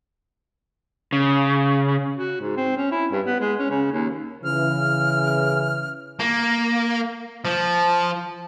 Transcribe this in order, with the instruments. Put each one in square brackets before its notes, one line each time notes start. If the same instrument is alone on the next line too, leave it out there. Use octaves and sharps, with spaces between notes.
[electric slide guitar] C#3
[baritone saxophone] F#4
G#2
C4
C#4
E4
G2
B3
G#3
C#4
C#3
D#2
[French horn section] C#3 E3 [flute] F6
[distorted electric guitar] A#3
F3